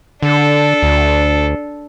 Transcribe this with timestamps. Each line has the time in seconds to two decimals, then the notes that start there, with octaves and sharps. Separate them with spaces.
0.22 D3 D4 A4
0.83 D2